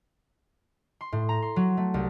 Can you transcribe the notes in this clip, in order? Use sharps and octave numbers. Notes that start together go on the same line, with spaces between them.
C6
A2
A#5
C6
F#3
A3
C2